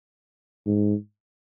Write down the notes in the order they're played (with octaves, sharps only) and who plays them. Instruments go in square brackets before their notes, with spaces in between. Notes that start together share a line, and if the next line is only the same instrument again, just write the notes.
[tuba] G#2